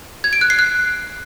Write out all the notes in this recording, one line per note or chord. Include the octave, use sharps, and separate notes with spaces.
G#6
D7
F#6
C7
F#6